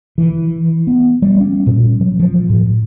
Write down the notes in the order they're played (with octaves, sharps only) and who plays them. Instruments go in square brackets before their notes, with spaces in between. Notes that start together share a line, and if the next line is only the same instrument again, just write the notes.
[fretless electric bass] E3
B3
G3
C#4
A#2
F#3
F3
A2